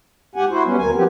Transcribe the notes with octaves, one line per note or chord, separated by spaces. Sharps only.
G#2 G4 F#5 G#5
E4 F#4 C5
F#3 G3 B3 C#4
D2 A#3 G#5
F3 F#3 B3 C4 G4